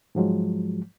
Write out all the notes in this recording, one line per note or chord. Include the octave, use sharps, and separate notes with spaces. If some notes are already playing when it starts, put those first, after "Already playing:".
G#2 F3 F#3 G#3